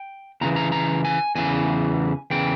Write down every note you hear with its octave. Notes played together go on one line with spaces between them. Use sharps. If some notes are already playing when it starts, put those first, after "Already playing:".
Already playing: G5
E2 C#3 E3 A#5
A#5
A#5
G#5
E2 C#3 E3 G#5
E2 C#3 E3 G5